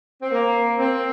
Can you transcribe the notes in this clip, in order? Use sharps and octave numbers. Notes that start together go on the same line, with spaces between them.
C4
A#3
C4